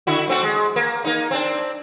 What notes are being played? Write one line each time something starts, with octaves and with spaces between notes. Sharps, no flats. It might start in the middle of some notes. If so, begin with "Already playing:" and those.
D3 E4 F#4
A3 C4 F#4
G#3
A#3
A#3 D#4
C4 D4